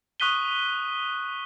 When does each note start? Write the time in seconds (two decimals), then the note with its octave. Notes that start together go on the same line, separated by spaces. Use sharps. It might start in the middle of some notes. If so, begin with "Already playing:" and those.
0.20 C#6 D#6 F#6 B6 D#7 G7